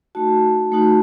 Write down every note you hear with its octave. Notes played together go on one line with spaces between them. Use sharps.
A3 D#4 F#4 A5
A3 D#4 F#4